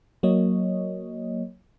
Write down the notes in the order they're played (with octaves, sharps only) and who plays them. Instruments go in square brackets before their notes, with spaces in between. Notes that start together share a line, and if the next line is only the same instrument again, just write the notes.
[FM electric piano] F#3 A#3 C#5 D#5